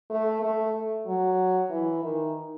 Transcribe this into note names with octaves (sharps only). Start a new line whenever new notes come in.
A3
A3
F#3
E3
D#3